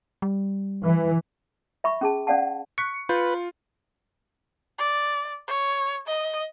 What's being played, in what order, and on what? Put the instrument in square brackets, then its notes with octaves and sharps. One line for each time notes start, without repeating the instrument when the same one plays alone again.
[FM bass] G3
[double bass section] E3
[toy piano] E5 B5 C#6
C#4 G#4 A5
C#4 D5 F5 F#5 A5
[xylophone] C#6 F#6 B6 [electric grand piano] C#7
[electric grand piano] F4 [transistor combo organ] B4 [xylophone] G6
[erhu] D5
C#5
D#5